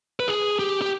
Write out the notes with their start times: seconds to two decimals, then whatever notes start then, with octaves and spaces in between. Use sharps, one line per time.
0.20 B4
0.28 G#4
0.59 G4
0.82 G4